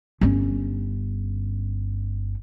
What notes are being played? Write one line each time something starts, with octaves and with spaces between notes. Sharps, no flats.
G1 C#4